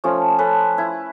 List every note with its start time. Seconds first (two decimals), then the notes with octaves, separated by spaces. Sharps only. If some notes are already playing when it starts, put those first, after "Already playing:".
0.04 F3 A3 C#4 F4
0.38 C#4 A4 B4
0.78 E4